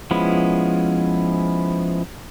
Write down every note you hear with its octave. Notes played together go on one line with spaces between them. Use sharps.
F3 G#3 B3 C#4 E4